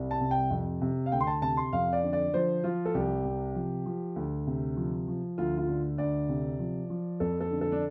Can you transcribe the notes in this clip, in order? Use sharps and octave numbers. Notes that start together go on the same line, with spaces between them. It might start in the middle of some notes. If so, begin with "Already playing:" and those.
Already playing: C2 G3
A5
C3
G5
F2
C3
F5
D2 G5
C6
A5
C3 A5
C6
F2 F5
D5
D3
D5
F3 C5
F3 F4
A4
C2 G4
C3
F3
F3
D2
C3
F3
F3
D2 F4
F4
D3
D2 D5
C3
F3
F3
F2 A4
A4
D3
A4
D4